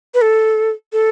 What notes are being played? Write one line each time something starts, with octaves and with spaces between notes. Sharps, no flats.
B4
A4
A4